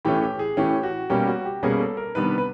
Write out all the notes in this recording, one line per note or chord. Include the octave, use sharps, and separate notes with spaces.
A2 E3 A3 C#4 G4
G4
G#4
A2 E3 A3 C#4 G4
F#4
B2 G3 A#3 C#4 G4
F#4
G4
B2 G3 A#3 C#4 G#4
A4
A#4
C3 D#3 G3 B3 D4 B4
B4